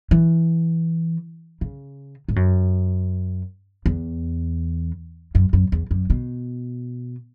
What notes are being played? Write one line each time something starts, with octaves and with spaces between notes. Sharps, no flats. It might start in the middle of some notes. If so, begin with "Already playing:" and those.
E3
C#3
G#2
F#2
E2
F#2
F#2
E2
F#2
B2